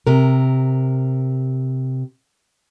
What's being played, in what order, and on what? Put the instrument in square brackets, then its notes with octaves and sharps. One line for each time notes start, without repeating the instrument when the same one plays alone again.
[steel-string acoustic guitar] C3 A#4